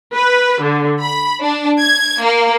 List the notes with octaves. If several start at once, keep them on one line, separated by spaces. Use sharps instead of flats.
B4
D3
B5
D4
G#6
A#3